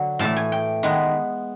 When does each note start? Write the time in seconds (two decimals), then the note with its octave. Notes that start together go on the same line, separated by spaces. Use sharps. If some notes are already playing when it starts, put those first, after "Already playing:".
Already playing: D3 F#3
0.19 A2 E3 A3 A5
0.37 G#5
0.52 G5
0.83 D#3 G#3 B3